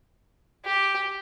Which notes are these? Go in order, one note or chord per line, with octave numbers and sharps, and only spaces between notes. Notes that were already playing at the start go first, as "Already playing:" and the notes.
G4